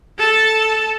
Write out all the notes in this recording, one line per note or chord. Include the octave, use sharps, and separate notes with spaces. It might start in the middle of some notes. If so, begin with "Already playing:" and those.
A4 A5